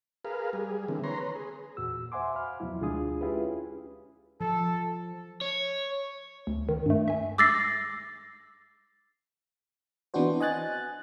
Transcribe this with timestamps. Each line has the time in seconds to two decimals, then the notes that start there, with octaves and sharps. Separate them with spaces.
0.25 G#4 A#4 B4 F5
0.53 G3 G#4
0.88 D3 E3 A#3 C4
1.04 B4 C#5 A#5 C6
1.20 B4
1.35 G#4
1.77 E2 A#2 F#4 E6
2.12 C5 E5 F#5 G#5 C6 D6
2.35 F5 B5 F6
2.60 E2 B2 F3 F#3 E4
2.81 D2 G#3 D4 F4 G#4 D#6
3.21 C#4 E4 F4 G4 G#4 B4
4.41 F3 A4
5.41 C#5
6.47 D2
6.69 D#3
6.86 G2 A3
7.08 E5 G#5
7.38 D6 E6 A6 A#6 C7
10.14 E3 B3 C4 D4 F#4 C5
10.40 D#5 G#5 F#6 A6